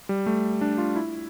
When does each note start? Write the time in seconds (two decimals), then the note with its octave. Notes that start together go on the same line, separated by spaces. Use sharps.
0.09 G3
0.26 A3
0.61 D4
0.78 F4
0.96 E4